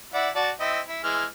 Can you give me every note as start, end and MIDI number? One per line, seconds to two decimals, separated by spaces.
0.14 0.30 64
0.14 0.30 74
0.14 0.30 78
0.35 0.51 66
0.35 0.51 74
0.35 0.51 81
0.60 0.80 60
0.60 0.80 64
0.60 0.80 75
0.88 1.00 64
1.04 1.25 52
1.04 1.25 56
1.04 1.25 89